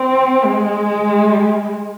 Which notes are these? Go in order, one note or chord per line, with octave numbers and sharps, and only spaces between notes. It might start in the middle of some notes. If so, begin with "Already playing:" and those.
Already playing: C4
G#3